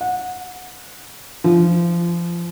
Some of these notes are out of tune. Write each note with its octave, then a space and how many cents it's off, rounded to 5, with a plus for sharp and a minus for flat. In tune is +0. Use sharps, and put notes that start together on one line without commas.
F#5 -20
F3 -25